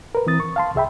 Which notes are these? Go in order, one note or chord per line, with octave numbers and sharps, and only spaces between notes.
A#4 B4
E3 C4 D#6 A6
C#6
F5 A5 C6
C2 G#4 E5 G5 B5